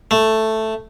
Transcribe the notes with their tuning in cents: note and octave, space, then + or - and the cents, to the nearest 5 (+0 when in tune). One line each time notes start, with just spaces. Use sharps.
A3 +0